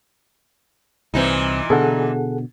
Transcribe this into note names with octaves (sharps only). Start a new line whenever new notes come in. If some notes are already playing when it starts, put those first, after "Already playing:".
C2 A#2 E3 C4 D#4
B2 D3 G#4 A4 F#5